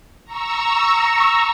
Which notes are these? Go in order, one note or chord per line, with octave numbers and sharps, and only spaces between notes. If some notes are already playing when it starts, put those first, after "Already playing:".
A#5 C#6 E6